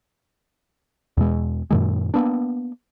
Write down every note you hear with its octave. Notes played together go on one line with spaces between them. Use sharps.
E2 B2 G#3
F#2 A#2 D#3 G#3
A#3 B3 D4